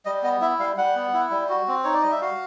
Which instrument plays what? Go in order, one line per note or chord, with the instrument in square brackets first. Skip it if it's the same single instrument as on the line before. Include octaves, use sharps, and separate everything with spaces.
[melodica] G3 D#5
B3 D#5
E4 E5
G3 F5
G3 F#5
B3
E4
G3
F#4
C4
D#4 C#5
D5
G3 D#5
E5
F#4 F5